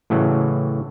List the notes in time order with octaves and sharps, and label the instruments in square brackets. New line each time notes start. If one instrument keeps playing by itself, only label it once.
[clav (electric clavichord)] A2 C#3 E3 F#3